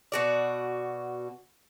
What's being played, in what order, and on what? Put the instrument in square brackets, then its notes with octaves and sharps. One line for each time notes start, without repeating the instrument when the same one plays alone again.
[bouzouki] B2 F#4 D5